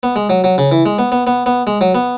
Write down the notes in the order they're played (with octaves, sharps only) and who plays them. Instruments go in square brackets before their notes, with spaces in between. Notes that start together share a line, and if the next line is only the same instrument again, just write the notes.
[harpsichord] B3
G#3
F#3
F#3
C#3
E3
G#3
B3
B3
B3
B3
G#3
F#3
B3